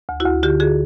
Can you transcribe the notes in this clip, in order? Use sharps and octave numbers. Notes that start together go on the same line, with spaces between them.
D2
E4 F#4
D2
D3 F4 G4
D3 F#4 G#4